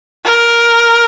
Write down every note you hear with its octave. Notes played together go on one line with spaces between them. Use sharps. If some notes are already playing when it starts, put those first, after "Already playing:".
A#4